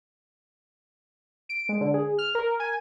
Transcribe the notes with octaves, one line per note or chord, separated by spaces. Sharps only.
D7
G#3
D3
G#4
F6
A#4
G#5